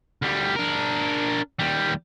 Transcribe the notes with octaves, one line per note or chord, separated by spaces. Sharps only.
D2 G3
D4 A#4
D#2 G3